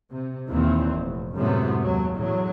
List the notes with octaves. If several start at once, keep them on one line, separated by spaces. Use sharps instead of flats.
C3
D#2 A#2 E3 C4
F1
F#2 A2 C3 G#3 A3 B3
D#2 F#3
E2 A2 F#3